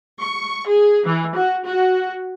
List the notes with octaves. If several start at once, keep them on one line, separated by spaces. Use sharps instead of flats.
C#6
G#4
E3
F#4
F#4